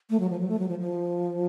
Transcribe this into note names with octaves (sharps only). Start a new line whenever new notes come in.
A3
F#3
F3
F#3
A3
F#3
F3
F3